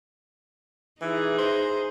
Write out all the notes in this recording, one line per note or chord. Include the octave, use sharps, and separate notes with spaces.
E3 D#4 G#4
C5